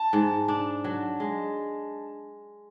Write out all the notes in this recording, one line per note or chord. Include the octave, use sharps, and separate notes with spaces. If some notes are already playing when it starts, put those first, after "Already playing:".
Already playing: A5
G#2
D4
F#3
G#3